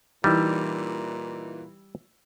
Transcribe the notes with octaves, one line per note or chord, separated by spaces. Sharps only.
A#2 E3 G3 D#4 E6